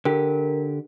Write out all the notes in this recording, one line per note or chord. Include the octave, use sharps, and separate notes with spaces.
D3 G4 A#4